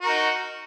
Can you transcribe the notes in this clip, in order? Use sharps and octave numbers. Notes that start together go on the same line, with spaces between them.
D#4 F#4 A#4